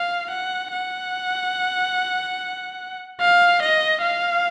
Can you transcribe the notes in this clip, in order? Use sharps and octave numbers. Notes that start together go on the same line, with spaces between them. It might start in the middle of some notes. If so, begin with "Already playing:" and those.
Already playing: F5
F#5
F#5
F5
D#5
F5